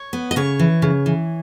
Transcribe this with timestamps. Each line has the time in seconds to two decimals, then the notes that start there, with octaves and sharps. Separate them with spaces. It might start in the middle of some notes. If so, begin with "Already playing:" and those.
Already playing: C#5
0.13 B3
0.31 D#5
0.36 C#3 C#5
0.59 E3
0.82 C#3
1.06 E3